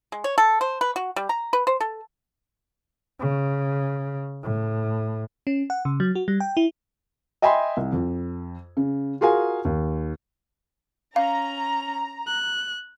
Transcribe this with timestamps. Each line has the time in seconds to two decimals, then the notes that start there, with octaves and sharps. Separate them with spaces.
0.12 G#3
0.24 C#5
0.38 A4
0.61 C5
0.81 B4
0.96 F#4
1.16 G3
1.29 A#5
1.53 B4
1.67 C5
1.80 A4
3.20 C#3
4.43 A2
5.47 C#4
5.70 F#5
5.85 C#3
6.00 F#3
6.15 F#4
6.28 G3
6.40 G5
6.57 E4
7.42 D#5 E5 G5 G#5 B5 C6
7.77 C2
7.93 F2
8.77 C#3
9.21 F4 F#4 G#4 A#4 F5 G#5
9.65 D#2
11.16 C#4 F5 A#5
12.27 F#6